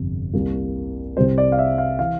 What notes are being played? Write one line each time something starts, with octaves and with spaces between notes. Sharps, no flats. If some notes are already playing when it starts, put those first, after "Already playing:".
Already playing: G1 F2 C3
C2 C3 G3 A#3
C2 C3 G3 C4 C5
D5
F5
E5
F5
E3 F5